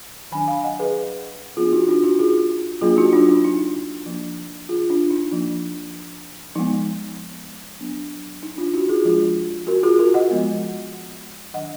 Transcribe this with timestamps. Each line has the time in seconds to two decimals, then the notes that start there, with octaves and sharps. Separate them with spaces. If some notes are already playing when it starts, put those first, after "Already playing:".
0.32 D#3 F#3 D4 G#5 B5
0.48 F5 G#5
0.64 D#5 F#5
0.79 G#4 B4
1.57 F3 B3 D4 F4 G#4
1.72 D#4 F#4
1.88 D4 F4
2.04 D#4 F#4
2.19 F4 G#4
2.81 F#3 A#3 D4 F4 G#4
2.97 D#4 F#4
3.12 D4 F4
3.29 D#4
3.44 D#4
4.06 F3 A#3 D4
4.69 F4 G#4
4.90 D4 F4
5.11 D#4
5.31 F3 A#3 D4
6.55 F3 G#3 B3 D#4
7.81 F#3 B3 D4
8.43 D#4
8.58 D4 F4
8.73 D#4 F#4
8.89 F4 G#4
9.05 F3 G#3 D4 F4 G#4
9.67 F#4 A#4
9.83 F4 G#4
9.99 F#4 A#4
10.14 D#5 F#5
10.30 F3 G#3 B3
11.54 D#3 F#3 D4 D#5 F#5